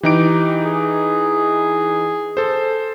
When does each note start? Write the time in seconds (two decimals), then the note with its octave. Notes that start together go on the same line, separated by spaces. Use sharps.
0.03 E3 D#4 G4 D7
0.64 G#4
2.37 A4 C5